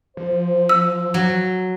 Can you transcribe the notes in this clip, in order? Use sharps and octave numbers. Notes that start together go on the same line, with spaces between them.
F3 C5
E6
F#3